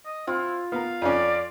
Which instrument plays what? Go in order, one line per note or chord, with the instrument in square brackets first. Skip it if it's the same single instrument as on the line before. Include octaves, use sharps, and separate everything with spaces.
[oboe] D#5
[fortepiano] C4 [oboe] E4 [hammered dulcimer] F4
[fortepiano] B3 A#4 [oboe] F5
[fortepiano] F2 C#4 [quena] D5